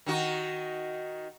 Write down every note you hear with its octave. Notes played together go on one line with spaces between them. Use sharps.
D#3 D#4 F#4